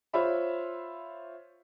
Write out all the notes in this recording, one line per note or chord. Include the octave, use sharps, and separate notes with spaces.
F4 C5 C#5 E5 B5